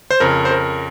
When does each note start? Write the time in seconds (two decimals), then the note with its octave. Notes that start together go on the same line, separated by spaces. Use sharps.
0.10 C5
0.20 F2 C#3 A#4
0.45 C5
0.51 A#4